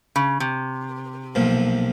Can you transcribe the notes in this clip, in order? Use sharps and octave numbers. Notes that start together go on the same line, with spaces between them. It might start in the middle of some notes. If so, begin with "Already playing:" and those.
C#3
C3
B1 A#2 F3